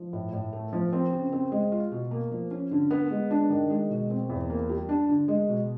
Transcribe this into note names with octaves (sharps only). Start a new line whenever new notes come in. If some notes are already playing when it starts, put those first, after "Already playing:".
Already playing: F3
A2
A2
A3
F3
C4
C#3
C4
G#3
F4
B2
A#3
F3
C#4
D3
B3
G#3
D4
D#3
G#3
B2
C4
E2
A#3
G3
D4
D3
G#3
B2